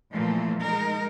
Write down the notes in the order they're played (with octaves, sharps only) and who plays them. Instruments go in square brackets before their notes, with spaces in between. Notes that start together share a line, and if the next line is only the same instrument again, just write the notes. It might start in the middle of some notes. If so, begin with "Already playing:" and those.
[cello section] A#2 E3 F3 A3 A#3
G#3 D#4 A#4